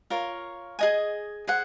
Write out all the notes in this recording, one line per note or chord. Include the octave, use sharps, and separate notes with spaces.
F4 A#4 C#5
G#4 D#5 G#5
G#4 C5 F#5